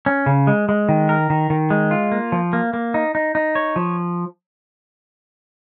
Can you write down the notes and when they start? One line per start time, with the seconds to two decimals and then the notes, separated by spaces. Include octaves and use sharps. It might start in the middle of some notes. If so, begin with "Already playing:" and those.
0.06 C#4
0.26 C#3
0.47 G#3
0.69 G#3
0.89 D#3
1.09 A#4
1.30 D#3
1.50 D#3
1.70 G#3
1.91 F4
2.12 A#3
2.32 F3
2.53 A#3
2.73 A#3
2.94 D#4
3.15 D#4
3.35 D#4
3.55 C#5
3.76 F3